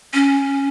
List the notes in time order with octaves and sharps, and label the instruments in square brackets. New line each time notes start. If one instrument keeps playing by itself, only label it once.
[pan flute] C#4